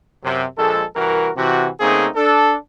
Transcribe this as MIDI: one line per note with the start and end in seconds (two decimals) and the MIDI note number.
0.24 0.45 42
0.24 0.45 48
0.57 0.83 34
0.57 0.83 56
0.57 0.83 69
0.96 1.30 36
0.96 1.30 52
0.96 1.30 66
0.96 1.30 70
1.35 1.68 48
1.35 1.68 52
1.35 1.68 66
1.80 2.07 49
1.80 2.07 57
1.80 2.07 58
1.80 2.07 60
1.80 2.07 63
1.80 2.07 68
2.15 2.55 62
2.15 2.55 69